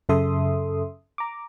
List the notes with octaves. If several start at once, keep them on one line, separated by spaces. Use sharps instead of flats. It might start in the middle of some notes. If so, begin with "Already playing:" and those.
F#2 C#3 A4 E5 C6 D#6
A#5 D6